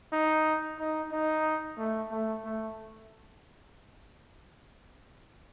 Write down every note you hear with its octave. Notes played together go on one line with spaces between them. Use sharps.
D#4
D#4
D#4
A3
A3
A3